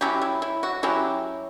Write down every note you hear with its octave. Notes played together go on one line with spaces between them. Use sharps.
F#3 C#4 E4 G4
E4
E4
F#4
F#3 C#4 E4 G4